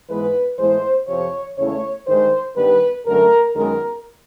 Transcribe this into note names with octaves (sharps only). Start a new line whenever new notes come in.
G#2 E3 G#3 B3 B4
A2 E3 G#3 B3 C5
F2 C3 F3 C#5
E2 C#3 E3 A3 C#5
G2 D#3 G#3 C5
G2 D#3 G3 B3 B4
F#2 D3 F#3 A3 A#4
F#2 D#3 G#3 B3 A#4